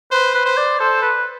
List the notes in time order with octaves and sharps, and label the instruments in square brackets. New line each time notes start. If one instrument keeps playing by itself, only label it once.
[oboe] B4 [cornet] C5
[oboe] B4
[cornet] C5
[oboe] D5
[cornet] A4 [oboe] C5
[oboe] B4